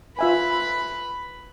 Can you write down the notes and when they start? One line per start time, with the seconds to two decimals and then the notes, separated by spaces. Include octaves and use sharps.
0.19 F4 B4 E5 G#5 B5